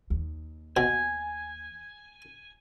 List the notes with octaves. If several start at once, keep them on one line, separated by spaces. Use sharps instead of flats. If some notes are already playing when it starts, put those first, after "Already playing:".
D#2
B2 G#5